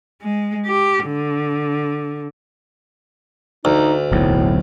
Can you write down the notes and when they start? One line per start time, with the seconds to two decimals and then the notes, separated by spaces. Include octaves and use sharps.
0.22 G#3
0.67 G4
1.05 D3
3.65 D2 D#4
4.11 D1 B1 E2 A2